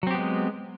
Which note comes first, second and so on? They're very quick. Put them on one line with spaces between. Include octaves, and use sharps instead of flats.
F#3 C4 G4 B3 G#3